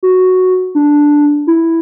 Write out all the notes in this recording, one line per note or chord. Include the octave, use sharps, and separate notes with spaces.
F#4
D4
E4